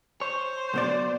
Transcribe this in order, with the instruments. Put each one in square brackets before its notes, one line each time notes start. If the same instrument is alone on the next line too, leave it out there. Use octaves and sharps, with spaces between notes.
[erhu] C5 [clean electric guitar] C#5
[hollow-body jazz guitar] B1 B2 D5